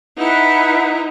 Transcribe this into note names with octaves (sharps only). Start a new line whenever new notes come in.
D#4 E4 B4 F#5